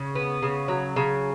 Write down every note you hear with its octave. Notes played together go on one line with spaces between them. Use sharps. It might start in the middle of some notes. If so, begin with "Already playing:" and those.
Already playing: C#3
B3
C#3
F#3
C#3